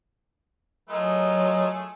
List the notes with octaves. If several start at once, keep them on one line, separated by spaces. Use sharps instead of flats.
F#3 A3 F4 G#4 A#4 D#5